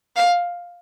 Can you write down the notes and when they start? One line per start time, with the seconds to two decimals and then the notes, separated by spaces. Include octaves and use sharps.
0.16 F5